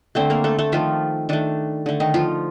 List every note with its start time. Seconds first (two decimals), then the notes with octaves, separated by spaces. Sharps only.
0.15 D3 A3 C4 C5
0.30 A#3 A#4
0.44 A3 A4
0.58 A3 A4
0.72 D#3 F3 A3 F4
1.29 D#3 A3 D4
1.86 D3 A3
2.00 D#3 D#4
2.14 F3 F4